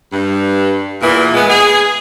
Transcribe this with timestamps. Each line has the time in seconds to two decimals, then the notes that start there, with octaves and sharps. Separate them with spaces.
0.13 G2
1.02 E2 A#2 E3
1.34 G#3 B3
1.50 G#4